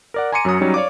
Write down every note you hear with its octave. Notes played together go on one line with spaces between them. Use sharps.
A#4 D5 F#5
G#5 A#5 C6 D6 C#7 D#7
F#2 F#3 C#4 D#6
F#3 G3 C#4 D#4
C#5 D5 F5 D6